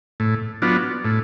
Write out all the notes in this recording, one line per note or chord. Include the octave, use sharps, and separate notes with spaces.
A2
F#3 B3 D4 F4
A2